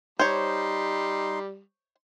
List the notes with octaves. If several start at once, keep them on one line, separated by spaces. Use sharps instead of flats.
G3 D#4 C5 C#5 C6